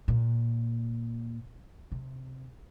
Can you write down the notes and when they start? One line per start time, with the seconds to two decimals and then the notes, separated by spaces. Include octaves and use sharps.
0.08 A#2
1.92 C3